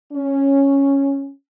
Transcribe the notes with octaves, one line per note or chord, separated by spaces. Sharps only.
C#4